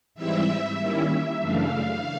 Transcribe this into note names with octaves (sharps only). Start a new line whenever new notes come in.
G#2 E3 G3 C4 E4 E5
D#3 G3 A#3 C#4 E4
F#2 C#3 E3 A3 D4 F5